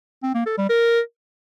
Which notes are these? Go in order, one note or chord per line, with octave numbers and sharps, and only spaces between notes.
C4
A#3
A4
G3
A#4